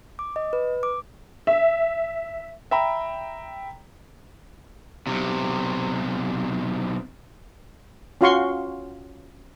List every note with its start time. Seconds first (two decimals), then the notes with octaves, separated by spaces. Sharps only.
0.19 D6
0.36 D#5
0.53 B4
0.83 D6
1.47 E5
2.71 E5 G5 A#5 B5
5.07 B1 C3
8.21 C#4 F4 F#4 F5 C6 C#6